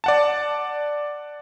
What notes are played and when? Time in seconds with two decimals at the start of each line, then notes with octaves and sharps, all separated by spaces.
0.04 D5 F#5 A5